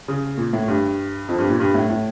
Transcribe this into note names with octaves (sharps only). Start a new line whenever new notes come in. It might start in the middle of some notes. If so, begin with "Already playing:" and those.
C#3
A#2
A2
G2
F2
G2
A#2
G2
A2
A2